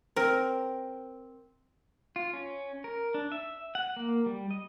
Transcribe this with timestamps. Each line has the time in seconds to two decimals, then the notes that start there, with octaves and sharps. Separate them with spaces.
0.16 C4 A#4
2.16 F4
2.33 C#4
2.84 A#4
3.14 D4
3.32 E5
3.75 F#5
3.96 A#3
4.26 G3
4.51 D#5